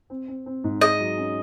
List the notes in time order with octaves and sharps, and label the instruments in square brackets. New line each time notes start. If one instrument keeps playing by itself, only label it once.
[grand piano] C4
C4
C4
G#2
[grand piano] G#4 [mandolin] D#5
[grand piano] F#3
C#4